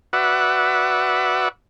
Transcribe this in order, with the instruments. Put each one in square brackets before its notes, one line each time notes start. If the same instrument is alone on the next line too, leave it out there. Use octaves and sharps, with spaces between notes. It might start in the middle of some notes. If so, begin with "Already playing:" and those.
[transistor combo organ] F#4 B4 D5 E5 F#5